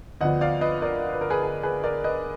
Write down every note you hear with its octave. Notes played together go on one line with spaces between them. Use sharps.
D2 D3 F3 B3 D4 D#5 F#5
D5 F5
B4 D#5
A#4 D5
B4
A#4
G#4 B4
G#4
G#4 B4
A#4 D5
B4 D#5